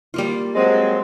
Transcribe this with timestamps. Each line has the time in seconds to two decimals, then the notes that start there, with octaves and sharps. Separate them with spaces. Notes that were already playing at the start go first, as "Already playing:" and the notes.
0.14 G3 A#3 F4
0.55 F#3 G#3 C4